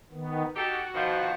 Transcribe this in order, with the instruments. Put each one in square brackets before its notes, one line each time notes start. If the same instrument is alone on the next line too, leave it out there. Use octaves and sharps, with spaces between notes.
[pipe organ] D#3 B3
[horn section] D#4 G4 A4 [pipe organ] F#4
[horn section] B2 D#3 F3